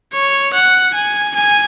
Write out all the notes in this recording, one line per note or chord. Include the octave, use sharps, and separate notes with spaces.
C#5
F#5
G#5
G#5